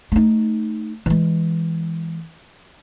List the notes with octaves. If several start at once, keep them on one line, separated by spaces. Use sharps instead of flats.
A3 D#4
E3 G#3